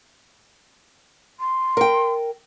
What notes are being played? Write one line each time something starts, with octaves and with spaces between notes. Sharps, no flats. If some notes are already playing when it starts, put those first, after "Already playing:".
C6
A#4 G5